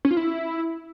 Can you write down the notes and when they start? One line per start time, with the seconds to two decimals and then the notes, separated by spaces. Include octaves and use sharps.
0.05 C#4
0.11 F4
0.17 E4